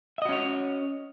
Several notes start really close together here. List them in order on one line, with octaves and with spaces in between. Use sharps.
E5 D#5 F#4 C#4 C#5